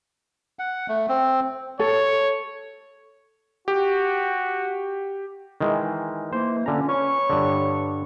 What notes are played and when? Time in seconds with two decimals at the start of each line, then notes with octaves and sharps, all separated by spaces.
0.59 F#5
0.88 A3
1.09 C4
1.80 A4 C#5
3.68 F#4 G4
5.60 D#3 E3 G#3
6.33 E3 A#3 C5
6.66 D3 F3 C#4 A#5
6.89 C#4 B4 C#5 C#6
7.30 G2 D3